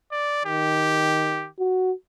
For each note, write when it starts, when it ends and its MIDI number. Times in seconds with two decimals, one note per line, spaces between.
0.12 0.44 74
0.45 1.49 51
0.45 1.47 67
1.59 1.92 66